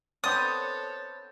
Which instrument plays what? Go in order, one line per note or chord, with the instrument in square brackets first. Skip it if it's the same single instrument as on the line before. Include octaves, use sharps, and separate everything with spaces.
[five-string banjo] B3 C4 D4 [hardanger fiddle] A4 C#5 [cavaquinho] D#6 [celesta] G6 A6